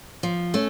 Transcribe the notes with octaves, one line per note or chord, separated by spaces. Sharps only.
F3
A3 C#4